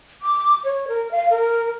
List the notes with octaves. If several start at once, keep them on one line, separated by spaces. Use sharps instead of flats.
D6
C#5
A#4
F5
A#4